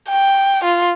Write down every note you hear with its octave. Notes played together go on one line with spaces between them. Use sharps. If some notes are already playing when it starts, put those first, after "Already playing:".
G5
F4